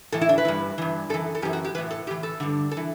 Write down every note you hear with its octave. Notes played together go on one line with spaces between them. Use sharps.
A2 E3 A4
E4
D4
B4
G2 E3
G2 E3
F#2 E3 A4
A4
F#2 E3 G4
F#4
G4
A2 E3 B4
A4
A2 E3 G4
A4
G2 D3
A4
E3